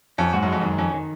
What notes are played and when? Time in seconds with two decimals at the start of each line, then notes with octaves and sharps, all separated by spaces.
0.18 F2 C#4
0.33 G#2 F#4
0.42 F#2
0.48 F2 G#3
0.61 F#2 D#3
0.78 F2 C#4
0.94 D#3